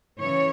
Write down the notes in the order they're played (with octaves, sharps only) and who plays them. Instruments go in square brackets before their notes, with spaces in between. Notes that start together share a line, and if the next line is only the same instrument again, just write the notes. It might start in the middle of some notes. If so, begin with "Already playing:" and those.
[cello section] C#3 E3 C#5